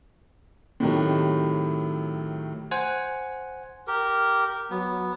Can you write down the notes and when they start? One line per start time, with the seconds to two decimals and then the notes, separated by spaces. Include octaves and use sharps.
0.80 A2 C3 D#3 F#3
2.71 C5 F#5 G#5
3.87 G4 A#4
4.71 F#3 B3